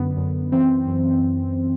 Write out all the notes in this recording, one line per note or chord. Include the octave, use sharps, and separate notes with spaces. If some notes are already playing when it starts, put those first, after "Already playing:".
Already playing: F#2 D3 B3
F#2
E3 C4
F#2